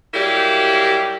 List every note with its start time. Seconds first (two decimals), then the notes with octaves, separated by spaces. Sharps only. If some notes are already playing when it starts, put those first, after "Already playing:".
0.13 F#3 G3 A#3 E4 G4